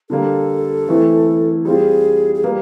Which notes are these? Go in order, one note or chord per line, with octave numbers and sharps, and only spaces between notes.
D3 G3 A#3 A4
E3 A3 C4 E4
G3 C4 F4 G#4
G#4
G3 A#3 B4